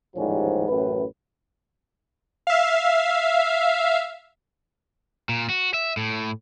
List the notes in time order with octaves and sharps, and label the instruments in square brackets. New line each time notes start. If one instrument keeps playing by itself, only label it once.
[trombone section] A1 D#2 G#2 F3 G3 C#4
A1 F#2 A2 B4
[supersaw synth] E5 F5
[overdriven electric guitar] A#2
F#4
E5
A2